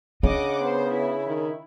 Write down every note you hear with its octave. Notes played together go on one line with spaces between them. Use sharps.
C#3 D4 D#5 F#5 D6
B3 C5
E4
D#3